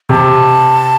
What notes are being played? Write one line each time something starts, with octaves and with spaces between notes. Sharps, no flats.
C3 A5